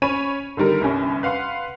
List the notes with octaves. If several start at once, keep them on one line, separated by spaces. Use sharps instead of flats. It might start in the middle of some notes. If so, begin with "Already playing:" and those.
C#4 C#5 B5 D#7
D3 D#3 G3 A#4
G1 C2 C#4
B4 F5 F#5 C6